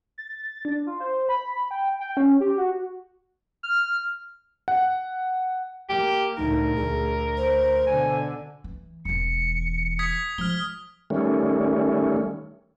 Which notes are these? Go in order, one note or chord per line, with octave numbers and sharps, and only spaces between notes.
A6
D4
F4
C5
B5
G5
G5
C#4
G4
F#4
F6
F#5
A#3 G4
D2 A#2 D#4 A#4
D2 G#4
C5
B2 D3 G#5
E3
E1 E3 C#7
D#6 G#6 B6
F3 G#3 F6 G7
D#3 G3 A3 C#4